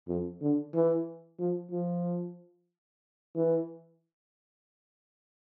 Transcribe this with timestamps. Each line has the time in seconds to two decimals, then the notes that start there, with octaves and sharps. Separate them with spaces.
0.08 F2
0.41 D3
0.74 E3
1.39 F3
1.72 F3
3.35 E3